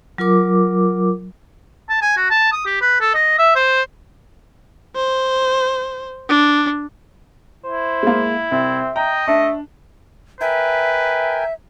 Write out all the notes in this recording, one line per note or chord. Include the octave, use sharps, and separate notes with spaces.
F#3 F4 A#4 D6
A5
G#5
F#4
A5
D#6
G4
B4
A4
D#5
E5
C5
C5
D4
E4 C5
G#3 A#3
C2 C4 E5
D#5 G5 A#5
A3 D4 E5
A#4 B4 E5 G5 G#5